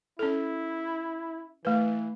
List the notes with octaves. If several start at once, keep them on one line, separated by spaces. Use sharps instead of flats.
C#4 E4 A4
E3 A3 B4